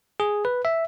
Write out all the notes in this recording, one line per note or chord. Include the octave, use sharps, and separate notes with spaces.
G#4
B4
E5